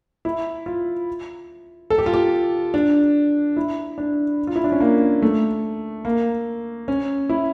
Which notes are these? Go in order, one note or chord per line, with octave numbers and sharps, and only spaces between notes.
E4
F4
A4
G4
F4
G4
D4
E4
D4
F4
E4
D4
C#4
A#3
A3
A#3
C#4
E4